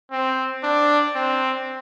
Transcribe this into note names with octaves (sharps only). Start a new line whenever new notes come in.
C4
D4
C4